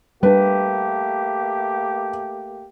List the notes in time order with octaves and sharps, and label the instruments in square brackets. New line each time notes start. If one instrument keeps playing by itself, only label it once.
[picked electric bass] G3 D4 [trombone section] A3 A#3 G4 [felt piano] B4